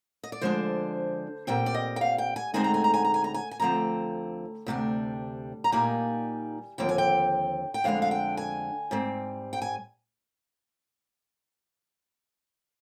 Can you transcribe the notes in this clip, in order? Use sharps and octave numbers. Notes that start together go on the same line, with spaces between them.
D#5
D5
D3 F3 G#3 D4 C5
A#2 G3 C4 G5
D5
D#5
G5
F5
G5
G#5
D2 D3 G#3 C4 D#4 G#5
A#5
G#5
A#5
G#5
A#5
G#5
A#5
G#5
G#5
D2 D3 F3 C4 A#5
D2 C3 G3 D4
A#5
A#2 G3 A#3 D#4 G#5
D#2 D3 F3 C4 G5
G#5
G5
G5
F2 D3 G#3 D4 F5
F5
G5
G#5
G#2 G3 C4
G5
G#5